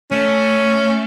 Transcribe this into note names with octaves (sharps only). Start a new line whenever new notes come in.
A3 C#4